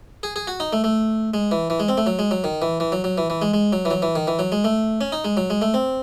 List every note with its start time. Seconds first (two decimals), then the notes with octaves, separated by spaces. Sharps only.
0.23 G#4
0.36 G#4
0.47 F#4
0.60 D#4
0.73 A3
0.84 A3
1.34 G#3
1.51 E3
1.70 E3
1.80 G#3
1.89 C4
1.98 A3
2.06 F#3
2.19 G#3
2.31 F#3
2.44 D#3
2.62 E3
2.80 E3
2.92 F#3
3.04 F#3
3.18 E3
3.30 E3
3.42 G#3
3.54 G#3
3.73 F#3
3.85 E3
3.91 F#3
4.02 E3
4.16 D#3
4.27 E3
4.39 F#3
4.52 G#3
4.64 A3
5.01 C#4
5.12 D#4
5.24 G#3
5.37 F#3
5.50 G#3
5.62 A3
5.74 C4